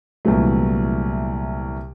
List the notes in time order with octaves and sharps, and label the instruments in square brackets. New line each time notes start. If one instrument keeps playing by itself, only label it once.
[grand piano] C2 A#2 E3 F#3 A3